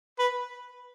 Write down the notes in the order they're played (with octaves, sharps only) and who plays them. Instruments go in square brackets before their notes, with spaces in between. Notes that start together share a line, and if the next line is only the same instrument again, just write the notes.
[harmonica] B4